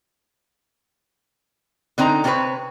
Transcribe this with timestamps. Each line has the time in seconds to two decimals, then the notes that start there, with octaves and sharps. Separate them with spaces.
1.98 D3 C4 D#4 G#5 A#5
2.24 C3 C4 F4 G#4 B4 C#5